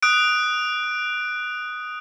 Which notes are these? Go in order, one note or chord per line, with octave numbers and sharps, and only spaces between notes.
D#6 F#6 D7